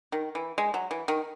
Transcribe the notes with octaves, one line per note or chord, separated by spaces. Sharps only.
D#3
E3
G#3
F#3
E3
D#3